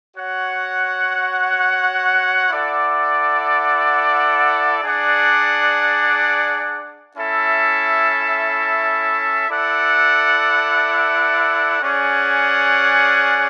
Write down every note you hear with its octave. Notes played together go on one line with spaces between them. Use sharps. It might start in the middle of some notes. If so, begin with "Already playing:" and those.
F#4 C#5 F#5
E4 A4 D5 F#5
D4 G#4 D5 F#5
C#4 E4 A4 E5
E4 A4 D5 F#5
C#4 G#4 D5 F#5